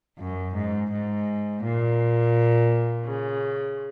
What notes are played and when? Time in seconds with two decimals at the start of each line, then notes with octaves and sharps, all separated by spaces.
0.16 F#2
0.53 G#2
0.89 G#2
1.61 A#2
3.04 C#3